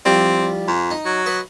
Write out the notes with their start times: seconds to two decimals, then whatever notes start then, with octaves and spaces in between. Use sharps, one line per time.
0.05 C2 F3 G3 C4
0.67 F2
0.91 D#4
1.05 F#3
1.26 B4 D#5